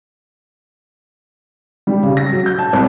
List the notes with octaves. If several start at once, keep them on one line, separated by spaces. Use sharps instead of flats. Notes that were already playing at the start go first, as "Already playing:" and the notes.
G3
C#3
A#6
F#3
G6
A5
C2